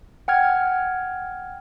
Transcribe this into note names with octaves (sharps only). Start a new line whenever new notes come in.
F#5 G5 F6 G#6